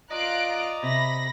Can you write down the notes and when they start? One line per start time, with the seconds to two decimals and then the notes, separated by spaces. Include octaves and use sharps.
0.10 F4 D5 D#5 A#5 F#6 D7
0.83 C3 B5 A#6